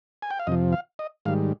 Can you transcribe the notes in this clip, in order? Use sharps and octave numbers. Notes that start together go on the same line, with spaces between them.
G#5
G5
F5
F2 C3 F3 D#5
F5
D#5
G#2 D#3 G3 F5